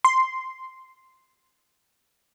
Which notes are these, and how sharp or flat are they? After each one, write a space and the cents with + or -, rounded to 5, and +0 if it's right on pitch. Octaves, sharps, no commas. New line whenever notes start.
C6 -5